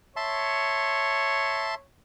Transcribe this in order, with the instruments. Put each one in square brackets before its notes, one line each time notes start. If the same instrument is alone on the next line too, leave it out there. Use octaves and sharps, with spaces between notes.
[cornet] C#5 [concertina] E5 A5 C6